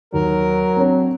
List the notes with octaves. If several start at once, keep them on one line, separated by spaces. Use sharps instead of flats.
D#2 F#3 A#4
C4 D4 C#5